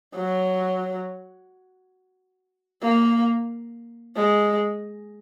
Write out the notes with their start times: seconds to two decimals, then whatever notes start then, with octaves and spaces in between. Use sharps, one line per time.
0.15 F#3
2.82 A#3
4.16 G#3